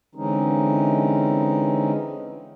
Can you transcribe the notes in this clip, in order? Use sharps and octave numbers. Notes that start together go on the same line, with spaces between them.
D3 E3 G#3 C4 C#4 D#4